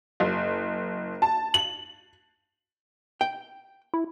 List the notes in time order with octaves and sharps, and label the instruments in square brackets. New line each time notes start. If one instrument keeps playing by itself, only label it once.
[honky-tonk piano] F#1
A5
F#7
[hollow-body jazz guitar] G5
[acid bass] E4